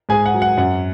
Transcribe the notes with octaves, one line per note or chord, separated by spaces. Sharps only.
G#2 G#4 G#5
F#5
F#3
F#5
F#2 F#5